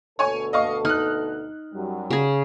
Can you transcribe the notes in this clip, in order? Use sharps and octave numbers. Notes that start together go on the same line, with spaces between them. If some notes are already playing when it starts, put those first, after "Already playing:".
D2 B2 A4 C#5 G#5 C#6
D#5 F5 C#6
D#4 F6 F#6
F#2 F#3 G3
C#3 G#4